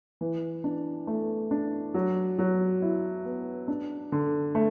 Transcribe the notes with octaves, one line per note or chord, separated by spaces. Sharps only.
E3
D4
A3
D4
F#3
F#3
E4
B3
D4
D3
A3